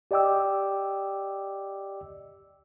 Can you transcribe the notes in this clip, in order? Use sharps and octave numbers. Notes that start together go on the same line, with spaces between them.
G4 D5 D#5 G5 D6 E6